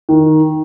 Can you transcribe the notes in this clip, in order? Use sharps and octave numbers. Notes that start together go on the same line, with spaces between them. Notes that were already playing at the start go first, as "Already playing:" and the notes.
D#3